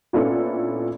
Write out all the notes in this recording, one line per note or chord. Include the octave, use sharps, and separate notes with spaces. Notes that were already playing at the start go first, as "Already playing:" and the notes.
A#2 B3 C#4 D4 E4 A4